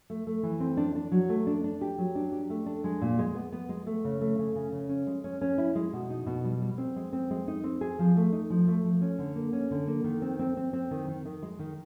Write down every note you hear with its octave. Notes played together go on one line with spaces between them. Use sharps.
A3
A3
E3
C4
D4
D4
F#3
A3
D4
D4
G4
F#3
D4
G4
A3
D4
G#3
A#2
G#3
B3
B3
G#3
A3
C#3
A3
C#3
C#3
C#3
C#4
G#3
C#4
C#4
E4
G#3
B2
D#4
B2
G3
G3
C4
G#3
C4
G#3
D#4
C4
G#4
F3
A3
D#4
F3
A3
F3
C#4
D3
A#3
C#4
D3
A#3
D#3
C4
C4
C4
C4
D#3
D#3
D#3
G#3
D#3